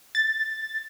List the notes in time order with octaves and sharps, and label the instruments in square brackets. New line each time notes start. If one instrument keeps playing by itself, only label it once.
[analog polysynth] A6